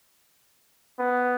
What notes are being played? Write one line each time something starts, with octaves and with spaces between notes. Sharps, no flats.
B3